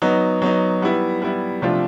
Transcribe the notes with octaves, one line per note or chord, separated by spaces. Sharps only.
F#3 B3 D#4
F#3 B3 D#4
G3 B3 E4
G3 B3 E4
C3 F3 A3 D4 F4